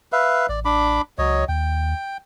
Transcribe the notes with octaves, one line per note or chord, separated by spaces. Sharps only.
B4 E5 F5
A1 D5
D4 B5 D6
C#2 F#3 C#5 D#5
D#2 G5